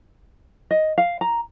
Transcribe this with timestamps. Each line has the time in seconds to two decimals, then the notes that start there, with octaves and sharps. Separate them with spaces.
0.71 D#5
0.98 F5
1.21 A#5